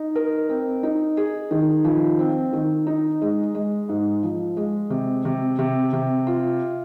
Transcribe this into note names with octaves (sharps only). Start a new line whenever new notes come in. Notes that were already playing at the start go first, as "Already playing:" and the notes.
Already playing: D#4
A#4
C4
D#4
G#4
D#3
F3
C4
D#3
D#4
G#3
G#3
G#2
F3
G#3
C3
C3
C3
C3
F4